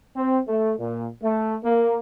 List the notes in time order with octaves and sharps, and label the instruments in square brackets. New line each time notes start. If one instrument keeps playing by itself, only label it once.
[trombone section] C4
A3
A#2
A3
A#3